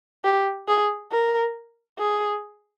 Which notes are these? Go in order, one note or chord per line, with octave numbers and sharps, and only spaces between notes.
G4
G#4
A#4
G#4